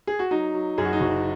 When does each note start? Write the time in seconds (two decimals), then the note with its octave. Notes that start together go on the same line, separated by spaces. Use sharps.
0.07 G#4
0.19 F#4
0.31 F#3 D#4
0.54 F#3
0.78 F#2 G#4
0.85 F#4
0.93 D#4
1.00 F#1 F#4